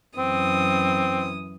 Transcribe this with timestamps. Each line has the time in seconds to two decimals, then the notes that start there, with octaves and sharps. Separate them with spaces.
0.18 F#2 E3 C4 D#6